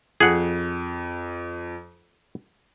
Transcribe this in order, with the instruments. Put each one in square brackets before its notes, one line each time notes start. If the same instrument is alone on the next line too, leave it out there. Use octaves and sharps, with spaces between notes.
[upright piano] F2 [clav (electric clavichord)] G#4 F#5